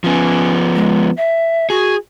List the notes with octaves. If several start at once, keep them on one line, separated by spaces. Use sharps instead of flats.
F3 B3 C#4
G#3
E5
F#4 G#4